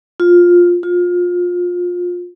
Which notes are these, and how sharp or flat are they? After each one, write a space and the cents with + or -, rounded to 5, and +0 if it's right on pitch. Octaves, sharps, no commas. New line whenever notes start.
F4 +10
F4 +25